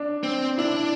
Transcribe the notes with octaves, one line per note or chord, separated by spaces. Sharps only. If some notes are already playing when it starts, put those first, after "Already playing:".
Already playing: D4
C4
D4 E4